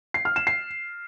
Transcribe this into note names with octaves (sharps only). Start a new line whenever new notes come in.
C7
F6
E7
C7